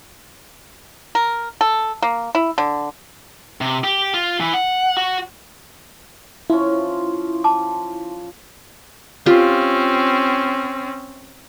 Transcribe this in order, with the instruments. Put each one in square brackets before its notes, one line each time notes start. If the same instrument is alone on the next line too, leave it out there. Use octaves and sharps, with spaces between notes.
[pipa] A#4
A4
A#3
E4
D3
[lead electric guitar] C3
G4
F4
E3
F#5
F#4
[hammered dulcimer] F3 C#4 [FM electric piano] E4
[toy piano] A5 D6
[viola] C4 C#4 [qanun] F4 G4